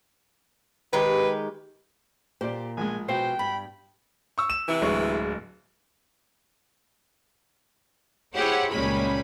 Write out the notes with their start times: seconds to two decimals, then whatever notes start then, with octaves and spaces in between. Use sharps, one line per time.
0.93 D#3 G#3 G4 B4
2.41 A#2 G4 C5 D5
2.77 A#1 G#3 G#5
3.08 B2 C5 G5
3.39 G2 B5
4.38 C#6 E6
4.50 E7
4.69 C3 E3 E4
4.82 D1 G#3 C#6
8.35 E4 G4 G#4 C5 C#5 F#5
8.71 C#2 A#2 G3 G#3 C#4 B5